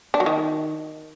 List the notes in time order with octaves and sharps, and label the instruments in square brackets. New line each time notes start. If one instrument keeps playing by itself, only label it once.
[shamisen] D4
F#3
D#3